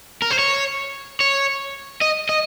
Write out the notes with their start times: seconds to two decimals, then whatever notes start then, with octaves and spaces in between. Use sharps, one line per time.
0.22 A#4
0.31 C5
0.39 C#5
1.20 C#5
2.01 D#5
2.29 D#5